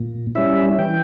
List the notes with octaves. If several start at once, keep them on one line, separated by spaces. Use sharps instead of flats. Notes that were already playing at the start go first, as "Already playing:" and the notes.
Already playing: A#2
G3 C#4 E4 E5
E3 G5